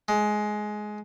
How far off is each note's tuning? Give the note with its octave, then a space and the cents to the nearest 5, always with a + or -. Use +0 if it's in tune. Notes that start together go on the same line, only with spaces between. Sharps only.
G#3 +15